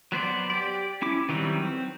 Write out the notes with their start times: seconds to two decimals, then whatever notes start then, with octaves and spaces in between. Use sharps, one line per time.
0.12 F#3 B3 C5 D5
0.50 G4 D5
1.02 C#4 E4 D6
1.29 D#3 E3 F#3 G3 C4
1.62 C4